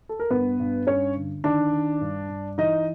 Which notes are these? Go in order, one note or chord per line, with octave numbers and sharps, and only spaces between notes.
A4
A#4
G2 B3 B4
G2
G2 C#4 C#5
D3
D#3 D4 D5
D#3
G2
G2
E3 D#4 D#5